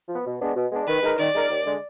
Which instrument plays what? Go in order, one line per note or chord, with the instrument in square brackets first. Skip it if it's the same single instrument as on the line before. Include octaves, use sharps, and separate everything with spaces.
[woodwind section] F3 B3
B2
G#3 B3 D4
B2
G#3 B3 D4
[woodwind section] D#3 [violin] B4
[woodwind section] G#3 D#4 A#4
[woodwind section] D#3 [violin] D5
[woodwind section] G#3 D#4 A#4
D#2
D3 G#3